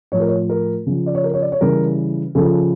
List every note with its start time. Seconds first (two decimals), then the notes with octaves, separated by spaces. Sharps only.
0.12 A2 F3 C#5
0.20 A#4
0.28 C#5
0.49 A#4
0.86 C#3 F3
1.06 D5
1.15 C#5
1.24 A#4
1.34 C#5
1.42 D5
1.52 C#5
1.61 C#3 E3 G3 A#4
2.35 C#3 F3 A4